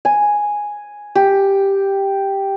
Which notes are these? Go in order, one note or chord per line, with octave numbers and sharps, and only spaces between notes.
G#5
G4